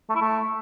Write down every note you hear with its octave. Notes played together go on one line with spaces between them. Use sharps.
A3
E4
A3